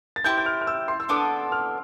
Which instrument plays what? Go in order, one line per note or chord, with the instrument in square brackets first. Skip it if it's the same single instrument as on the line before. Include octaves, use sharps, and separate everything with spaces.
[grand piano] A6
[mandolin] E4 G4 C5 [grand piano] G6
[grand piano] G6
F6
F6
E6
C6
E6
[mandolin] B3 D4 A4 [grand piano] D6
[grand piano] F6